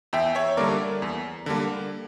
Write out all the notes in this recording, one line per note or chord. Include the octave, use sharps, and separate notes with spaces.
E2 E5 G5
C#5 E5
D3 G3 A#3 A#4 D5
E2
D3 G3 A#3